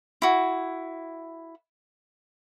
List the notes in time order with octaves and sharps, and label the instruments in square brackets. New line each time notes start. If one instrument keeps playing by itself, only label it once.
[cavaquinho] E4 F#4